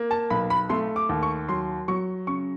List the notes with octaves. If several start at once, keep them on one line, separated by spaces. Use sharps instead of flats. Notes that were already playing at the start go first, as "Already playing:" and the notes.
Already playing: A#3
A5
B1 B5
B5
A3 C6
D6
D#2
C#6
F#3 C6
F#3 C#6
C#3 C#6